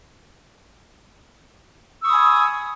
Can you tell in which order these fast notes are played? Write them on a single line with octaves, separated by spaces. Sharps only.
E6 C#6 D#6 B5 G#5